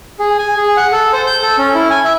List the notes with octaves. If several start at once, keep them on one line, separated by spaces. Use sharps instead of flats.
G#4
G#5
G#4
F#5
A4
C5
G6
A4
C#4
E4
G#5
E5